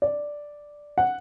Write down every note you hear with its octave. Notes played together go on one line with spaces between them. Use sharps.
D5
F#5